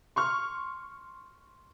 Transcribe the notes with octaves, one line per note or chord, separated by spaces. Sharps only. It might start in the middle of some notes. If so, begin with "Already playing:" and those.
C6 C#6 F6